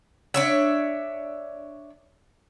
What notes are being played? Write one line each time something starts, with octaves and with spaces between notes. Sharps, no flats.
D4 C#5 E5